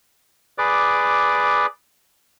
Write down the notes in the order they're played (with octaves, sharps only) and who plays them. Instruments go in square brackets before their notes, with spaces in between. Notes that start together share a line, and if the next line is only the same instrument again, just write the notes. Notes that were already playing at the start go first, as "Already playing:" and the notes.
[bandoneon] G#4 B4 D5 D6